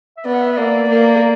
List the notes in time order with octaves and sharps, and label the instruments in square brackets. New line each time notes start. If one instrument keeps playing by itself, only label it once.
[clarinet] E5
[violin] B3 [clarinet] D5
[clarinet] F#5
E5
E5
[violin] A#3 [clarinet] D5
[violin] A#3